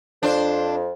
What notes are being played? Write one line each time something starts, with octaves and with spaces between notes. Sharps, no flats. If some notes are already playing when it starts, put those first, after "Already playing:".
F2 F3 D4 C5